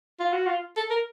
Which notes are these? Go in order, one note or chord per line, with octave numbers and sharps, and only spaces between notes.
F4
F#4
F4
A4
A#4